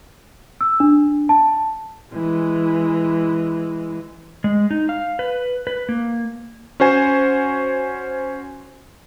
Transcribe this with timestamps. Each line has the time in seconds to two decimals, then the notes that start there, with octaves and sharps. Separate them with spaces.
0.61 E6
0.80 D4
1.29 A5
2.13 E3 G#3
4.44 G#3
4.71 D#4
4.89 F5
5.19 B4
5.67 B4
5.89 A#3
6.80 C#4 F#4 C5 G#5